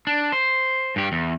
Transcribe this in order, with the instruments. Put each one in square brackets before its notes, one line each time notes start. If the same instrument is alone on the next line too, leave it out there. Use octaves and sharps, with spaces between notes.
[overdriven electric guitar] D4
C5
G2 G4
E2